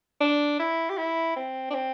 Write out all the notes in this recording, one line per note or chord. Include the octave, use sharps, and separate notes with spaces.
D4
E4
G4
E4
C4
D4
C4